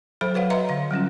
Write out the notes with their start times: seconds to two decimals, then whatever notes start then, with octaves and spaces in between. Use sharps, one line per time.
0.21 F#3 A4 C5 B5
0.35 F#4 B4 C#5 F5 F#5
0.50 B4 D#5 E5 A#5 C6
0.69 D3 F5
0.91 F#3 G3 C#4 F4